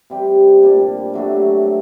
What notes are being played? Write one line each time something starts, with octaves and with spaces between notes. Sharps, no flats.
C3 G3 C4 G4
A#2 G3 D4
C3 F#3 A3 D4